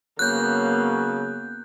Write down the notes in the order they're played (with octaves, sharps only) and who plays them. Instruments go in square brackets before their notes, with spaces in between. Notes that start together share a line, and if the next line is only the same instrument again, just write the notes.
[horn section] C#3 F#3 [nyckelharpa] A#3 B3 [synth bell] F#6 G6